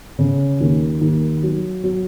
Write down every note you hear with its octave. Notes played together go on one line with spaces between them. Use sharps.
C#3
D#2
D#2
F#3
F#3